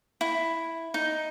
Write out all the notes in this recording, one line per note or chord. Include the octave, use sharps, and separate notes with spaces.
E4
D#4